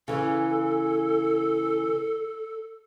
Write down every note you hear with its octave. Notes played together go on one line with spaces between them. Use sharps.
C#3 E3 A4